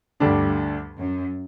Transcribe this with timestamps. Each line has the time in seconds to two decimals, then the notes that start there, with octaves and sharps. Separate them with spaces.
0.20 D2 G2 D3 G3 D4
0.98 F#2